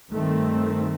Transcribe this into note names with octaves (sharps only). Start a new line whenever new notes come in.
G2 D#3 A3 C4